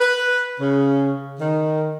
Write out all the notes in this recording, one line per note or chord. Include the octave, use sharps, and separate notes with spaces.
B4
C#3
D#3